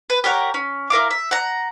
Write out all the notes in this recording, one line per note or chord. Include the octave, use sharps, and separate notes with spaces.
B4
G4 A#4 C#5 F#5
C#4
E4 A#4 F5 D6
E5
F#5 A#5